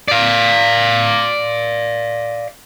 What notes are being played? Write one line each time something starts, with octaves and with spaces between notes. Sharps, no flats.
D5 F5